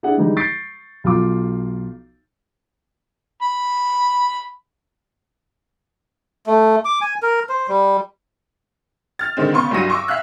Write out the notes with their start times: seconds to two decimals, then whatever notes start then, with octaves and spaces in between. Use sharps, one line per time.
0.03 D4 E4 G#4 F#5
0.17 D3 E3 G3 G#3 D#4
0.37 C#6 G6 A6 B6 C7 D7
1.04 B1 F4 D6
3.42 B5
6.47 A3
6.85 D6
7.01 G#5
7.23 A#4
7.49 C5
7.68 G3
9.19 F6 A6
9.37 D3 D#3 G#3 C4
9.52 C#3 B3 C6 C#6
9.71 C2 G2 F#3 A#6 D#7
9.90 C#6 D6 E6
10.08 E5 F5 F6 F#6